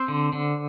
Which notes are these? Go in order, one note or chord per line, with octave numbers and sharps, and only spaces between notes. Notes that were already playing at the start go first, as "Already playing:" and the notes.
Already playing: C4 C5
D3
D3